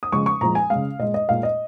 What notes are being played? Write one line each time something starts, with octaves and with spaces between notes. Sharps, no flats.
D#6
C#3 F3 G#3 C#6
C#6
A#2 F3 G#3 A#5
G#5
C#3 G#3 F5
A#2 G#3 D#5
D#5
A#2 G#3 F5
D#5